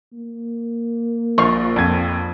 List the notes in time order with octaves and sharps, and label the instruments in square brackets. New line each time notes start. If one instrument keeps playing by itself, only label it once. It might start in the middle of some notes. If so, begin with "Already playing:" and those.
[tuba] A#3
[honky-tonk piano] A#1 [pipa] F5 C#6
[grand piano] F2 G#6